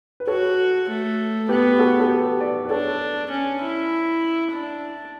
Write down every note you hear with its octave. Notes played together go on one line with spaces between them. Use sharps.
B4
F#4 A4 C#5
A3
B3 G4 B4
G4
F#4 A4
A4
G4 B4
B4 D5
B4
D4 A4 C#5
C#4
E4
D4